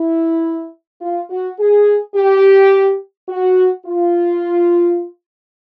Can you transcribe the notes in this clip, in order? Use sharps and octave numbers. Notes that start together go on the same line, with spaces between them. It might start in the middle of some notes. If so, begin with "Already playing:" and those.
Already playing: E4
F4
F#4
G#4
G4
F#4
F4